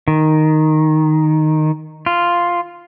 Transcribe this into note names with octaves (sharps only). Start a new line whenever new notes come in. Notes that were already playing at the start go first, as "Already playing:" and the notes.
D#3
F4